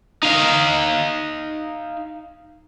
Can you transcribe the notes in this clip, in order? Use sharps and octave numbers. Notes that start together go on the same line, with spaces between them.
D#4 F5